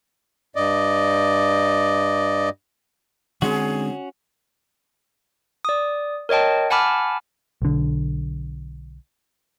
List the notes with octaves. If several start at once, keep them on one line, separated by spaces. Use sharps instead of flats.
G2 D5 D#5
D3 G#3 C4 C#4 F#4 G#4
D5 D#6
A#4 C#5 D#5 G5 A5
F#5 G#5 A5 B5 D6 F6
B1 D3